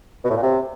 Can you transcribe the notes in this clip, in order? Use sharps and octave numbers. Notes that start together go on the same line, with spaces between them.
B2
A2
A#2
C3